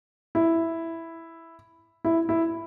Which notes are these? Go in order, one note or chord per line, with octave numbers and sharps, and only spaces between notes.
E4
E4
E4